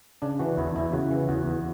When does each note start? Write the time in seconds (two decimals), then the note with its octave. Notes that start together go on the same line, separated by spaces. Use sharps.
0.22 C#3 D4
0.39 E3 F#4
0.57 E2 E4
0.76 E2 E4
0.93 C#3 F#4
1.11 E3
1.29 E2 F#4
1.46 E2